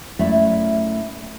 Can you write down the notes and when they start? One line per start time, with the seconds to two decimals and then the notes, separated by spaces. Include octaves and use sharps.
0.19 F#2 A3 E4 D5 E5 F5